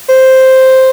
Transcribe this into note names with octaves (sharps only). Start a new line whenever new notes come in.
C5